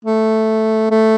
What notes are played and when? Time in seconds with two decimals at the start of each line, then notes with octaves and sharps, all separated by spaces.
0.05 A3
0.91 A3